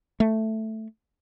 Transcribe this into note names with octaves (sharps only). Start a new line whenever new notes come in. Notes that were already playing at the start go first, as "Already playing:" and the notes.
A3